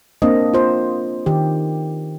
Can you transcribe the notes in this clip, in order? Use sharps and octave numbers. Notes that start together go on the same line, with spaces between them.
A#3 C4 D4 D#5
F4 C5
D#3 G4